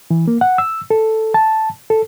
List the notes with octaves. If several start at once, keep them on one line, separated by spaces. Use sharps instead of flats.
E3
A#3
F#5
E6
A4
A5
A4